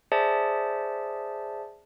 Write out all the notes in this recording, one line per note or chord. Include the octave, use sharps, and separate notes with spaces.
G#4 C5 D5 E5 A5